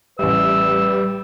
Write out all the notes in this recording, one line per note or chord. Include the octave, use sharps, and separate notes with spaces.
A1 G3 B4 E5 E6